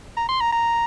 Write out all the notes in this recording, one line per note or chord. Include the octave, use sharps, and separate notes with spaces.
A#5
C6
A#5
A#5